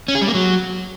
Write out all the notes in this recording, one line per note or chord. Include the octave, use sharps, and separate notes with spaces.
C#4
G#4
G3
A#3
F#3